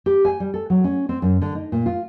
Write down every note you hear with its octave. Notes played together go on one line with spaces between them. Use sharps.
G4
G#5
G3
A4
F#3
C#4
C4
F#2
D3
D#4
A#2
F4